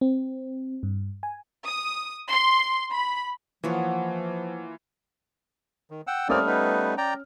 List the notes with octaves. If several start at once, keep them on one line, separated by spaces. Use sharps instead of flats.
C4
G2
G#5
D#6
C6
B5
E3 F3 A#3 B3 F4 C#5 F#5
D#3
F#5 G5 E6
G3 A3 A#3 C4 C#4 D5 D#6 F6
B3 D#4 B4
D5 G5 A#5